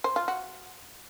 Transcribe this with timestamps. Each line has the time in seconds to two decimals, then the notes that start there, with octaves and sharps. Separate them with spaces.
0.04 C5
0.16 F4
0.28 F#4